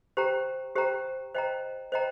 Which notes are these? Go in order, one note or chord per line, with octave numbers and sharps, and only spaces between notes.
G4 C5 G5 A#5
G4 C5 G5 A#5
C5 D#5 G5 A#5
C5 D#5 G5 A#5